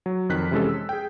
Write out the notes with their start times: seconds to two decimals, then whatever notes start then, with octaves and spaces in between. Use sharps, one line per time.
0.06 F#3
0.29 F2 D#3 F#6 B6
0.51 C3 E3 G#3 C#4 G4 A4
0.69 E6
0.89 G#4 G5